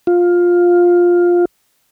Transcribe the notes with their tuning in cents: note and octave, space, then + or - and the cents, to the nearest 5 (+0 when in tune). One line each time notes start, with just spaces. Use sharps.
F4 +10